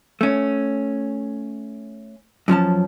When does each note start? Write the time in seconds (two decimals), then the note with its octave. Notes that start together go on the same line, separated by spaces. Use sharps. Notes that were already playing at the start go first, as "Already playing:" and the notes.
0.21 A3 C#4
2.48 F#2 F3 C#4 A5